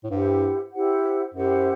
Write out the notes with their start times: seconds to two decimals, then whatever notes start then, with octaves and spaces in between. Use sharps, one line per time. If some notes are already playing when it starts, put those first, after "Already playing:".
0.04 A2
0.10 G2 E4 G4 C5 F#5
0.73 E4 G4 C5 F#5
1.34 F#2 E4 G4 C5 F#5